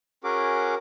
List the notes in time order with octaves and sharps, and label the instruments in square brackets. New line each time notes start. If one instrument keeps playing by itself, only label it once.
[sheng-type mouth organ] C#4 F#4 G#4 A#4 D6